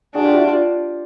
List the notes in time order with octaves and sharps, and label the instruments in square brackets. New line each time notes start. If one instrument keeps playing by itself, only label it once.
[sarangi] D4 [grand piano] F#4 G#4
[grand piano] F4 G4
E4 F#4
F4 G4